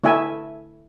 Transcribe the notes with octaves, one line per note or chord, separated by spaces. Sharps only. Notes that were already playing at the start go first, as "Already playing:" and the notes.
A3 E4 E5 G#5